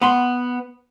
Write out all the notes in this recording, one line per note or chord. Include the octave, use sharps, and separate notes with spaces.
B3 B5 C6